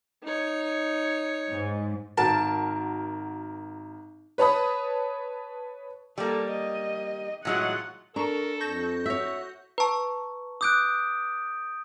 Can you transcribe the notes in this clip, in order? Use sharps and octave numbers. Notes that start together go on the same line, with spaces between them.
D#4 C#5
G#2
G#1 F#4 A#4 A5
B4 C#5 A5 B5 D#6
G3 A#3 A4
D#5
A2 F#3 G#3 F4 F#5
D4 A4 A#4 A#5 C#6
F2 C#6 G6 A#6
F#4 C#5 E5
B4 A5 A#5 C#6
D6 D#6 F#6 G6 D7